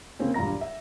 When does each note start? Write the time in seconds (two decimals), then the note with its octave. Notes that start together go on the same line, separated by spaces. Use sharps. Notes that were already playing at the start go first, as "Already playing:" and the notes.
0.19 C#3 A#3 C4 C#4
0.34 E1 G2 F4 A#5 A#6
0.61 E5